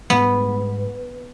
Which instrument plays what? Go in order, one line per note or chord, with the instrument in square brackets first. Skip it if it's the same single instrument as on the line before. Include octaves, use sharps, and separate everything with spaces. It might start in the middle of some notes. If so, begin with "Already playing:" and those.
[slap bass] G#2 G3 G#3 [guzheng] B3